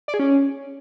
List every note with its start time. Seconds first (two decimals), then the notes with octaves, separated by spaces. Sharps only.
0.08 D5
0.14 G#4
0.19 C#4